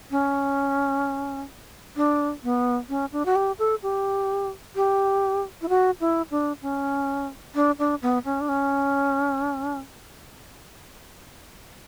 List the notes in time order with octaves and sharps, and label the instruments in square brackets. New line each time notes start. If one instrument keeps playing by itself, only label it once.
[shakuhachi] C#4
D4
B3
C#4
D4
F#4
G4
A4
G4
G4
E4
F#4
E4
D4
C#4
D4
D4
B3
C#4
D4
C#4